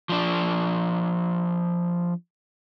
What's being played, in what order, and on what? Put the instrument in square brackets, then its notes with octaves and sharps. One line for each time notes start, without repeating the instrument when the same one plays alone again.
[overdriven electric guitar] F3 D4